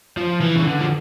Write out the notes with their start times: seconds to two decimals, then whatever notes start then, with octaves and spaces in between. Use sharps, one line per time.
0.17 F3
0.41 E3
0.55 C#3
0.63 D3
0.81 F3